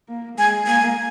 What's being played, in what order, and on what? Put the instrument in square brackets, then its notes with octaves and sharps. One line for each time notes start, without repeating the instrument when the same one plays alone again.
[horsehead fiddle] A#3
[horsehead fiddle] G#3 [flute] G#5
[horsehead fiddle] A#3 [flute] G#5